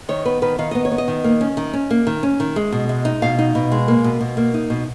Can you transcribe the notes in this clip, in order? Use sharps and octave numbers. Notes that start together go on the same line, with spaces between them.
D#3 C#5
B3 B4
D#3 B4
D#3 F5
B3 D#5
C#5
B3
D#5
D#3
A#3
C#4
D#3
C#4
A#3
D#3
C#4
D#3
G#3
B2
G#3
D#4
B2 F5
D#4
B2
G#3
A#3
B2
B2
A#3
D#4
B2